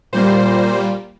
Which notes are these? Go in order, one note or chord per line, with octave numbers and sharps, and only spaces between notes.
A#2 G3 A#3 C5